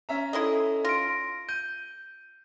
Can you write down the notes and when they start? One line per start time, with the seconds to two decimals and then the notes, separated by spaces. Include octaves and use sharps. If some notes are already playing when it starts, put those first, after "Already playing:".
0.09 C#4 E5 A#5
0.33 E4 G#4 A4 D#5
0.85 F4 A#6 D7
1.49 G6 D#7